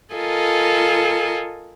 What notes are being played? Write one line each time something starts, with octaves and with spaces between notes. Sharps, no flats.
F4 A4 A#4 D#5 G#5